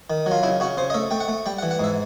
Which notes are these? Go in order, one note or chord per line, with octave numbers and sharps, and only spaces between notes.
D#3
F#3
F4
C#3 E4
C#3 F#4
C#3 C5
D#5
A3 E5
A3 G5
F#5
A3
G3 G5
F#5
E3
F#5
G#2 E5